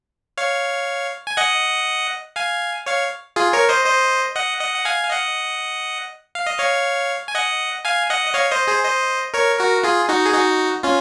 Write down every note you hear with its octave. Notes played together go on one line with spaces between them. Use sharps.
C#5 F5
G#5
D#5 F#5
F5 G#5
C#5 F5
F4 G#4
A#4 C#5
C5 D#5
C5 D#5
D#5 F#5
D#5 F#5
F#5
F5 G#5
F5
D#5 F#5
F5
D#5
C#5 F5
G#5
D#5 F#5
F5 G#5
D#5 F#5
D#5
C#5 F5
C5 D#5
G#4 C5
C5 D#5
A#4 C#5
F#4 A#4
F4 G#4
D#4 F#4
G#4
D#4 F#4
C#4 F4